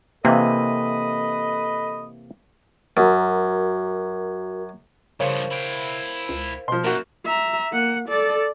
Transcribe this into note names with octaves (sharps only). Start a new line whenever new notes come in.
C3 E3 A#3 A4 B4 D#5
F#2 F#4 A#4
G2 C#3 F3 A#4 C5 C#5 F5
E4 G5
C#2
B2 F3 C6
F#2 A#3 F#4
E5 A#5
A#3 F#5
A4 D5